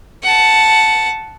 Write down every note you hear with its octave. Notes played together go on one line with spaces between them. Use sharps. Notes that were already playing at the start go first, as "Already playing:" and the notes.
F#5 A5